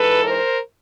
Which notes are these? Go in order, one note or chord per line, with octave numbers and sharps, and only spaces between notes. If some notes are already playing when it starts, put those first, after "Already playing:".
Already playing: G#2 E3 A4 B4
A#4 C5